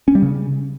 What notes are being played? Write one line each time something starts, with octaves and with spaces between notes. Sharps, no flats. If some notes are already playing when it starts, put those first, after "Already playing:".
C#4
G3
C#3